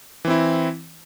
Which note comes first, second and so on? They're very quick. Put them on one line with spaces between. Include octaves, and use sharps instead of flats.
E3 C4 E4